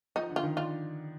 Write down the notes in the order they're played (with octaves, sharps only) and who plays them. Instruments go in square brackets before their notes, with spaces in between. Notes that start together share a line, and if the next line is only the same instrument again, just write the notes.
[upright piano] F3 [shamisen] D#4
[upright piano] D3
[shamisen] F4
[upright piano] D#3
[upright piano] D4 [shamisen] F4